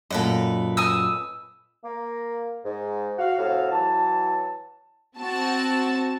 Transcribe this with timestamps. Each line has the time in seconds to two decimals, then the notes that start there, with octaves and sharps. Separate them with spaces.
0.11 F#2 A#2 A4 B4 D#5
0.77 G#5 D#6 E6
1.84 A#3
2.64 G#2
3.18 F#4 F5
3.37 A2 C3 F#4 A4 F5
3.71 E3 F#3 A5
5.19 C4 F#4 A5